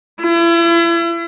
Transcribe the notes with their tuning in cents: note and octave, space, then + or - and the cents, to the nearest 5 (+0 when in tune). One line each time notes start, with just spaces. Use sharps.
E4 +40